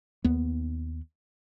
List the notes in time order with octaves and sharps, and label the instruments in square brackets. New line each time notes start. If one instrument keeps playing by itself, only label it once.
[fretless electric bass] D#2 B3